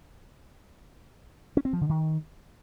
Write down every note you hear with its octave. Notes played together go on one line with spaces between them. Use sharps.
C#4
C4
F3
D3
D#3